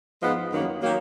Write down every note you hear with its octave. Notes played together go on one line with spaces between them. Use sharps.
G#2 F3 G#3 B3
F#2 D#3 F#3 A#3
D#3 F#3 A#3